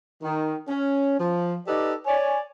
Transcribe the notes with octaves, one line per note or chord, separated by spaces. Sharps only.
D#3
C#4
F3
D#4 G4 A4 B4 D5 D#5
C#5 D5 G#5